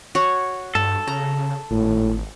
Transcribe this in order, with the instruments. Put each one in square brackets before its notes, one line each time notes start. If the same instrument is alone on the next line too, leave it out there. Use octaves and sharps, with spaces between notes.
[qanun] F#4 C#5 F#5
[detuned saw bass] G2 [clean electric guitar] A4
[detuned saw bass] C#3 [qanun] A#5
[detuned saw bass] G#1 [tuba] A2